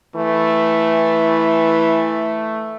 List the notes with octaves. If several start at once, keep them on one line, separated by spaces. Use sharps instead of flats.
E3 A3